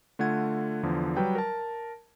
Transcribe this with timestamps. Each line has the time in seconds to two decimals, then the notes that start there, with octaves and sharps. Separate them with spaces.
0.19 D3 A3 F4 F#5 G#6
0.83 E2 D3 F3
1.17 F#3 G3 B4 G5
1.35 A#4 A5